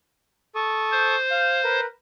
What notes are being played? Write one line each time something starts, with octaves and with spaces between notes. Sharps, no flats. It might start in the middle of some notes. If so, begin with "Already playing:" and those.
A4 C#6 D#6
C5
F5
A#4 B4